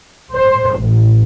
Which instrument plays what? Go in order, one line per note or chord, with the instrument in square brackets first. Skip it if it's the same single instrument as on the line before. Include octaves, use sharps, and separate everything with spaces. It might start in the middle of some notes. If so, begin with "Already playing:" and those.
[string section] C5
A1